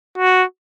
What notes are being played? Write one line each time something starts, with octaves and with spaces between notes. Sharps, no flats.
F#4